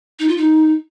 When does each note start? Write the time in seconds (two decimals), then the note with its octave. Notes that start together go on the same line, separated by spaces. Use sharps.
0.19 D#4
0.28 F4
0.37 D#4